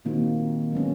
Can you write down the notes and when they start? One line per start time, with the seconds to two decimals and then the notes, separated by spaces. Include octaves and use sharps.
0.05 A#2 D#3 A#3 C4 D#4 F#4
0.72 F#3 G#3 B3 C#4